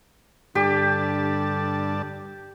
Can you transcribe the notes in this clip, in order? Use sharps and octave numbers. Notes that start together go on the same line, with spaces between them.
G2 D3 G4 D5 A5